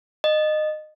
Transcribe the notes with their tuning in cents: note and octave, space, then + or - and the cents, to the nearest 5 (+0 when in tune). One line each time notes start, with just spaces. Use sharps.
D#5 -20